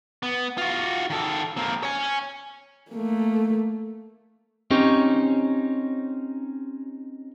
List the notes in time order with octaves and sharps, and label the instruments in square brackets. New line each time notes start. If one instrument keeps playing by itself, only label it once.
[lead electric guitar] B3
F4 F#4
D#3 A4
A#3 C4
C#5 G#5
[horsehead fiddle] A3 A#3
[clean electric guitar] C4 C#4 D#4 G4 C#5